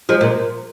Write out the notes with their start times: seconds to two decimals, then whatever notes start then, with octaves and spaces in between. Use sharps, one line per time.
0.09 F3 G#3
0.21 A#2